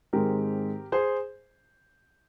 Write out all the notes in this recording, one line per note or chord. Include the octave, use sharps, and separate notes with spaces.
G#2 D#3 G#3 C4 G4 A#4
G#4 C5